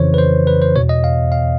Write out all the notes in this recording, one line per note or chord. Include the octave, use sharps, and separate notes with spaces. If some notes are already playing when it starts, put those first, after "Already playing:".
Already playing: F2 C#3 E3 C5 C#5
B4
C5
B4
C5
E2 B2 C#5
D#5
F5
F5